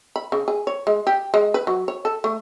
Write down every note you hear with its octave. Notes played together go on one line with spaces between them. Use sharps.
B5
C#3
G#4
C#5
G#3
G4
G#3
B4
F#3
C#5
A4
A3